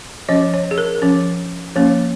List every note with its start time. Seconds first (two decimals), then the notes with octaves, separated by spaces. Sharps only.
0.29 F3 C#4 D#5
0.54 C#5
0.71 G#4
0.78 A#4
1.02 F3 C#4
1.75 F3 A#3 C#4